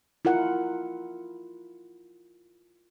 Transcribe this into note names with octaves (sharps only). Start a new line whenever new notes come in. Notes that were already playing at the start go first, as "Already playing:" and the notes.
E4 F4 A#4 F#5